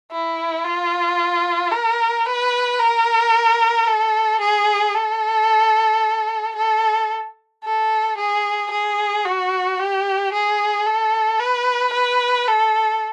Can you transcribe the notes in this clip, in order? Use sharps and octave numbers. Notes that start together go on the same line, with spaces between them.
E4
F4
A#4
B4
A#4
A4
G#4
A4
A4
A4
G#4
G#4
F#4
G4
G#4
A4
B4
B4
A4